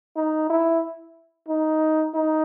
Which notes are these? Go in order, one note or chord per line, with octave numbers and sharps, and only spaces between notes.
D#4
E4
D#4
D#4